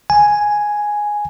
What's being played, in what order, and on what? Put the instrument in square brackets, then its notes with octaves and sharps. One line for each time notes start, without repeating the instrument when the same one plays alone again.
[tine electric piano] G#5